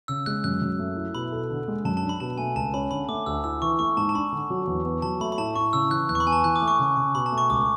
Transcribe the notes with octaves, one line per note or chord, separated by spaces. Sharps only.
C#3 E6
G#3 F#6
F#2 F#6
F#2
A3
E4
B2 B5
A4
D3
G#3
F#2 A5
A5
D4
B5
B2 A5
A3 G#5
C#2 A5
C#4 B5
D3 B5
A3 D6
D2 E6
E4 E6
E3 C#6
A3 C#6
G#2 A5
A5
D4 B5
D3
F#3
E2
B3
F#3 A5
A3 B5
B5
A2 A5
A2 C#6
C#3 E6
E3 F#6
E2 F#6
C#6
B5
B3 G#5
A5
E3 F#6
D6
A3
C#6
C#3
C#3
B2 B5
A5
A3
C#6
C#2 D6